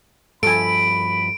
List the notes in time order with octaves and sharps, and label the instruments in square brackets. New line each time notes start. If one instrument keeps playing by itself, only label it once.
[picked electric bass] G2 F3 [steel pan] A4 G#5 [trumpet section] B5 [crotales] D7